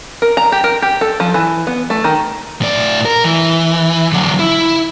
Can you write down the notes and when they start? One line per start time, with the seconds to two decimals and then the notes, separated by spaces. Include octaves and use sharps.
0.22 A#4
0.37 A#5
0.52 G4
0.64 A#4
0.82 G4
1.01 A4
1.20 F3
1.34 E3
1.67 B3
1.90 A3
2.04 D#3
2.61 A2 D5
3.05 A#4
3.24 E3
4.13 D3 F#3
4.39 E4